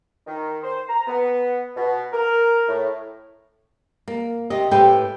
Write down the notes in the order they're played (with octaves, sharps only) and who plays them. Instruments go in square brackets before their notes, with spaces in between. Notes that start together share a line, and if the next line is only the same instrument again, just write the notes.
[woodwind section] D#3
C5
A#5
B3
B2
A#4
A2
[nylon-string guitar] A#3
C3 G4 D#5
A2 G4 B4 C5 G5